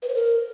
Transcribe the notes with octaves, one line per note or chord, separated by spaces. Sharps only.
B4
C5
A#4